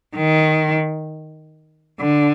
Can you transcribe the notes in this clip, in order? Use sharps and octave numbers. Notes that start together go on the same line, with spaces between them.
D#3
D3